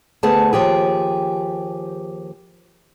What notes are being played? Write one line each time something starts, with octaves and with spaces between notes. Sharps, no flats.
D2 A3 B3 G#4 A5
D#2 F3 G4 G#4